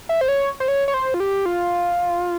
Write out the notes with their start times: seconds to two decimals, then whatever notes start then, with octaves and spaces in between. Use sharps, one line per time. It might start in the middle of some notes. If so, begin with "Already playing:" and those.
0.09 E5
0.21 C5
0.28 C#5
0.60 C5
0.68 C#5
0.88 C#5
0.94 C5
1.14 F4
1.20 G4
1.46 F4